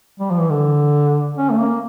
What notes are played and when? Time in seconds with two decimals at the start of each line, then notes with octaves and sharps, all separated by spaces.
0.20 G3
0.31 F3
0.40 E3
0.50 D3
1.37 C#4
1.51 A3
1.59 A#3